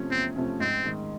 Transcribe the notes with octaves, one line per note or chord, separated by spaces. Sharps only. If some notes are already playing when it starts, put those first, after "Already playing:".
Already playing: E2 C3 F3 A3 C#4
E2 C4
C3 F3 A3 C#4
G#2 C4
D#3 G#3